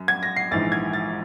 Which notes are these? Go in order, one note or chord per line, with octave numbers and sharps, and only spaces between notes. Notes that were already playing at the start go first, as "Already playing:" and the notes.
Already playing: F#2
G#6
A#6
C7
A#1 G#2 E3 A6
G#6
A6